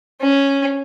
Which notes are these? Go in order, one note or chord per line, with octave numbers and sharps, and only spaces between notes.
C#4